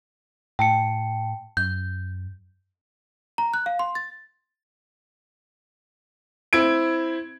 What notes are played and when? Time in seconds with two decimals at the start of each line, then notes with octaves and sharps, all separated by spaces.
0.59 A2 G5 A5 C#7
1.57 F#2 G6
3.38 A#5
3.54 F#6
3.66 F5
3.79 C6
3.95 A6
6.53 C4 E4 G#6 D7